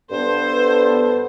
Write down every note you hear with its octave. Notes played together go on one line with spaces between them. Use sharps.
G2 B3 A4 C5